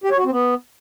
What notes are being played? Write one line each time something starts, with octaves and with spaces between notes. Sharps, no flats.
G4
C#5
F#4
C4
B3